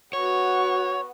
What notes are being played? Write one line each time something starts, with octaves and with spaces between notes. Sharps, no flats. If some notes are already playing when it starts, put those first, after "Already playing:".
B3 F#4 C#5 F#5 C#6